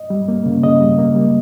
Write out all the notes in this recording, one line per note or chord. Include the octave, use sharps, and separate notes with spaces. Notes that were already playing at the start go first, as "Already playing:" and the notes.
Already playing: D#5
G3
A#3
C#3
C#3 D#5
G3
A#3
G3